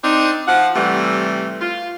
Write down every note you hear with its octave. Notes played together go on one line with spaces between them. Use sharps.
C4 D4 D#4
F3 F#5
C3 E3 G3 A3
F4